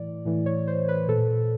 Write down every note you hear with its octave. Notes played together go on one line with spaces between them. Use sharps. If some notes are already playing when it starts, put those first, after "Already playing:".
Already playing: A2 E3 D5
A2 E3
C#5
C5
B4
A#2 A4